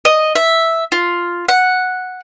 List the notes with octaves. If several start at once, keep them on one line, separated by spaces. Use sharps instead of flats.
D#5
E5
F4
F#5